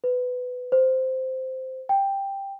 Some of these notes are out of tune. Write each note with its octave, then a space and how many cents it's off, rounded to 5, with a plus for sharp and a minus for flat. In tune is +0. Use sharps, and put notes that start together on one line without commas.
B4 +15
C5 -5
G5 +5